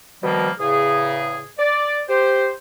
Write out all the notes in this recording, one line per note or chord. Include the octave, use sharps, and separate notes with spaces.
B2 D#3 F3 G3 A#3
E2 A2 C#3 G#4
D5
G4 C5